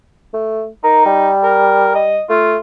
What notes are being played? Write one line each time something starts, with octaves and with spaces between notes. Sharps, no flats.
A3
D#4 A#4
G3
A#4
D#5
A3 F4